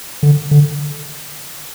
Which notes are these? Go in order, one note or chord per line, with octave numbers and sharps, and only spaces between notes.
D3
D3